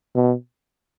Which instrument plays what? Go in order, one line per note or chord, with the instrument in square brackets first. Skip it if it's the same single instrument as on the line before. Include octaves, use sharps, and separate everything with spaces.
[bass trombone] B2